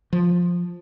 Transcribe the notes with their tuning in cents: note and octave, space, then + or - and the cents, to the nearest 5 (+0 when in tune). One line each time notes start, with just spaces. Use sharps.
F3 +10